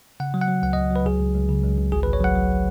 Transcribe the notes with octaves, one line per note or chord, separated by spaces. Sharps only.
C#3 F#5
F#3
F#5
F#3
C#2 F#5
D#5
C#2
F#3 B4
C#2 G#4
C#2
C#2
C#3
C#2
C#2
G#1 G#4
B4
G#1
C#5
F#3 F#5
F#3